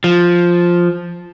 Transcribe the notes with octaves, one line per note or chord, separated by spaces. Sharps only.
F3